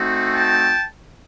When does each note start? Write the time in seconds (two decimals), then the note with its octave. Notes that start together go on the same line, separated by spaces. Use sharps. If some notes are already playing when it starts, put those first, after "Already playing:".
Already playing: A3 C4 D#4 F#4
0.34 G5 A5